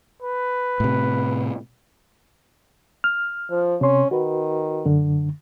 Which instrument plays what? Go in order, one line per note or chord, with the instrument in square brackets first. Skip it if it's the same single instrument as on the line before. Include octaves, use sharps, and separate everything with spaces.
[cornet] B4
[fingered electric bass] A2 C3
[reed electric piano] F6
[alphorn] F3
[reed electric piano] C3 C6 [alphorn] C#4
[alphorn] D#3 [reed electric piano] F#4 B4
[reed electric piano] F#2 D3